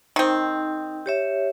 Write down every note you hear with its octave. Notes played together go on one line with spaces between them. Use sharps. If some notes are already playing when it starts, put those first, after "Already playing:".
D#3 C4 D#4
G4 C#5 E5